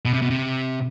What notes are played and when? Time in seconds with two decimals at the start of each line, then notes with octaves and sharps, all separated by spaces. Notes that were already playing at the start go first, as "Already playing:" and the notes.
0.05 B2
0.13 C3
0.22 B2
0.30 C3